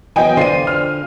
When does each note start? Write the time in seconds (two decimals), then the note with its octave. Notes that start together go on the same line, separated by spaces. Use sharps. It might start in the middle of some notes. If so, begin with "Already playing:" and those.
0.16 E3 F#3 B3 D#5 G5 G#5
0.37 D3 F4 C5 D5 C7 D#7
0.67 F6